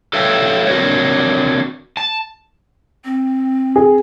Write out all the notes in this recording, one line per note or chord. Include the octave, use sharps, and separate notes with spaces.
A4 B4 C#5 E5 F5 G5
C4 D4 F#4 A#4 B4 C#5
A5
C4
G#4